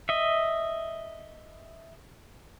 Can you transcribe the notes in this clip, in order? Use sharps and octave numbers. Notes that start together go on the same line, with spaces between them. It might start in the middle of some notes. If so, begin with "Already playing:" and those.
D#5 E5